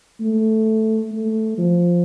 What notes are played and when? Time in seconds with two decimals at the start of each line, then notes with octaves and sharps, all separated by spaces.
0.21 A3
1.12 A3
1.58 F3